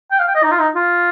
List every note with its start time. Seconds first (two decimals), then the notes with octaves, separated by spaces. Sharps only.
0.11 G5
0.19 F5
0.28 G5
0.35 D#5
0.43 D#4
0.51 F4
0.59 D#4
0.75 F4